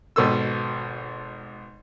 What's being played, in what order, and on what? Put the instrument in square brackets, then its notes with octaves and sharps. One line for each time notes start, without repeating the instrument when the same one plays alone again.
[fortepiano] G#1 B2 A4 E6